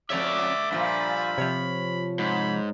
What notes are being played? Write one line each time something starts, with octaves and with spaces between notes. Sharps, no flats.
F2 A3 C#5 D5 E5 D6
G2 A#2 F3 B5
C3 F3 C#5
G#2 B5